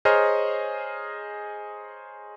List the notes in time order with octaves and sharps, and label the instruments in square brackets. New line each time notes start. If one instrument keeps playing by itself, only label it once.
[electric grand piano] G#4 C5 C#5 D#5 A#5 F6